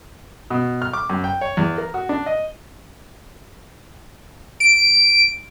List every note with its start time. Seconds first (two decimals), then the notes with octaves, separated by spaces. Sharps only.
0.50 B2
0.82 F6
0.93 D6
1.10 F#2
1.24 G5
1.41 C#5
1.57 E2
1.78 A#4
1.94 F#4
2.09 D4
2.26 D#5
4.60 D7